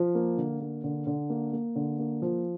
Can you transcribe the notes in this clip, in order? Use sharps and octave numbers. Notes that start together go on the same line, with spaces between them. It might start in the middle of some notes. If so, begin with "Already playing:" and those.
Already playing: F3
A#3
D3
A#3
D3
D3
A#3
A#3
D3
A#3
F3